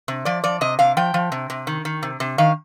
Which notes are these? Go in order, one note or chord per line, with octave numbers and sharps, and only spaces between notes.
C3
F3 D5
F3 D5
C3 D#5
C3 F5
F3 G5
F3
C3
C3
D#3
D#3
C3
C3
D#3 F5